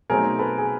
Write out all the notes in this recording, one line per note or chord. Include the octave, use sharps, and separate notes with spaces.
B2 F#3 A3 C4 D#4 G#4 A#4
A4 B4
G#4